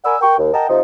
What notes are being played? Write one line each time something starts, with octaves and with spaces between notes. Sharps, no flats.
A#4 D5 F#5 G#5 B5 E6
A#4 G5 C#6
D#2
A#4 D#5 F#5 G5 A5 A#5
C3 F3 D#4